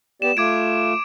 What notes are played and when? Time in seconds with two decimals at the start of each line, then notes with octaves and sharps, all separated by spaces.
0.22 B3 G4 D5 E7
0.37 A3 F4 D6 G#6 D7